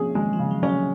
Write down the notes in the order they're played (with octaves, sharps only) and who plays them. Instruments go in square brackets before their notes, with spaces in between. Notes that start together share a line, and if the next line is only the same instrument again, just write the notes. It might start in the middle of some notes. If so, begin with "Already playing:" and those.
Already playing: [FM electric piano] F3 A#3 C4 [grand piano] C#4 G#4
[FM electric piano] D#3 [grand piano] G#3
[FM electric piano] F3
[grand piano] C#3
[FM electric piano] F#3
[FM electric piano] F#3 [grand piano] C#4
[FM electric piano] G#3